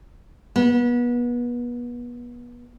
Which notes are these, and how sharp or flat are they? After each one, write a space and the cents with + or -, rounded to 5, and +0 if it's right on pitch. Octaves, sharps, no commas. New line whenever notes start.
B3 -30